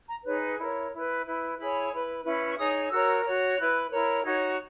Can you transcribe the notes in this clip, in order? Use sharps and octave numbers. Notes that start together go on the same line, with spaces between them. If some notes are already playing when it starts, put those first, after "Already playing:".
A#5
D#4 G#4 B4 C#5
E4 A#4 C#5 D#5
E4 B4
E4 B4
E4 G#4 C#5 B5
E4 B4
C#4 E4 B4
C#6
D#4 G#4 C#5 D#6
F#4 A#4 C#5 E6
F#4 C#5
E4 B4 F#6
E4 A#4 C#5
D#4 F#4 C#5 G#6